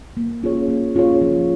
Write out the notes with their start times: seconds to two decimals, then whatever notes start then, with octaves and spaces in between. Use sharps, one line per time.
0.17 A#3
0.43 C#4 F4 G#4 C#5
0.68 A#3
0.95 C#4 F4 G#4 C#5
1.21 F3